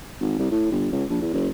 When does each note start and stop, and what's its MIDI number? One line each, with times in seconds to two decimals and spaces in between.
0.21 0.38 32
0.39 0.47 36
0.51 0.68 45
0.71 0.88 31
0.92 1.04 37
1.10 1.19 34
1.21 1.30 40
1.34 1.49 30